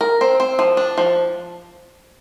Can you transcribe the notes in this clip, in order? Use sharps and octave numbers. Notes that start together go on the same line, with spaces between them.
A#4
C4
C4
F3
D4
F3